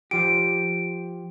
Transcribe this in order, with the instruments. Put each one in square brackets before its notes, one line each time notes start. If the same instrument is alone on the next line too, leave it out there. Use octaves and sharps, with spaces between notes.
[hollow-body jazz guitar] F3 G4 [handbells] D7